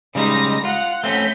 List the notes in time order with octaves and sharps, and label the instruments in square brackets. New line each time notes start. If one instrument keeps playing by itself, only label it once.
[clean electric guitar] C#3 G3 G#3 [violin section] D#4 A#6
[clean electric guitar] F4 [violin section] F#5
[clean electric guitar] A3 C4 C#4 [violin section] G6 B6